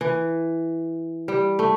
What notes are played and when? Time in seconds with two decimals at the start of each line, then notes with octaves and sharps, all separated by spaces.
0.01 E3
1.28 G3
1.59 A3